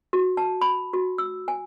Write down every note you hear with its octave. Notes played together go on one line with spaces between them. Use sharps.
F#4
A5
B5
F#4
E6
G#5